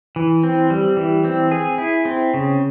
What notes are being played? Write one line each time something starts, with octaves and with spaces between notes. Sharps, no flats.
E3
C4
G3
E3
C4
G#4
E4
C4
C#3